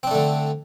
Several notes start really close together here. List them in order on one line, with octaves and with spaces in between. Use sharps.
C4 D4 A3 D3